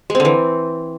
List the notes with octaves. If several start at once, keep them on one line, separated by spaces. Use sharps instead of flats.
G#3
C4
D3
E3